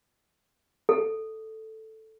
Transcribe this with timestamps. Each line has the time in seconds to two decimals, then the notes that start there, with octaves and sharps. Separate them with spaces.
0.89 A4